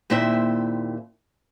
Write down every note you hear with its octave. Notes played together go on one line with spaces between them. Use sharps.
D#2 A#2 C4 E4 C5 E5